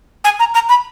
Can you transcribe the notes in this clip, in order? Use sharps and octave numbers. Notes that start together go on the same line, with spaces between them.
G#5
A#5
A#5
B5